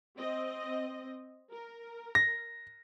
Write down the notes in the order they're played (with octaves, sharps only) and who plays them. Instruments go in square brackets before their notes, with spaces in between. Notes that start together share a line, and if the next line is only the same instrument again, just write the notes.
[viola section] C4 D#5
A#4
[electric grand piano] A#6